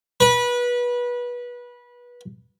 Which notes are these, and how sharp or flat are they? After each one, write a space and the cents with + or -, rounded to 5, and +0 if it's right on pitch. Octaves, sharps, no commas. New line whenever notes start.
B4 -25